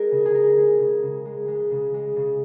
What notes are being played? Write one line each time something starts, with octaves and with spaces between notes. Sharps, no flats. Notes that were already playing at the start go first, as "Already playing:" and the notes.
Already playing: G#3 G#4 A#4
C#3
G#4
G#3 A#4
G#3
C#3
C#3
G#3
G#3
C#3
G#3
C#3